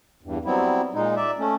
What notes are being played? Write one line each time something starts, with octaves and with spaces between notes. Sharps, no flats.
E2 G2
F#3 G3 B3 C4 E4
A#2 G#3 D#4
D5 E5
A3 C#4